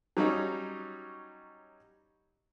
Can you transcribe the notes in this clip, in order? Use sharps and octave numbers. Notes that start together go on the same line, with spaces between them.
F#3 G3 C#4 D#4